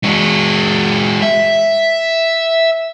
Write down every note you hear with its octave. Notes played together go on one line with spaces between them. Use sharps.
G#3 F#4
E5